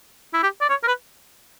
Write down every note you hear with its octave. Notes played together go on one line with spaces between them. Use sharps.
E4
G4
D5
C#5
A#4
B4